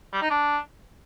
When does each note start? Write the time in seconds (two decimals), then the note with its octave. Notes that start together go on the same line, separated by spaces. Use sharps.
0.13 G3
0.22 D#4
0.30 D4